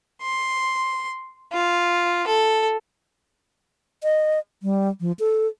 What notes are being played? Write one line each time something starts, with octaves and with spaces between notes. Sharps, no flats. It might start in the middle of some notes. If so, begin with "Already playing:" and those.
C6
F4
A4
D#5
G3
F3
A4